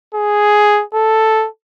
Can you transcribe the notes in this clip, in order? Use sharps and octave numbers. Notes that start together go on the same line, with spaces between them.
G#4
A4